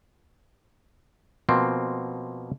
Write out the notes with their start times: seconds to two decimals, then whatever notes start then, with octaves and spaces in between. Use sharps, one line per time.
1.49 B2 F3 A#3 C4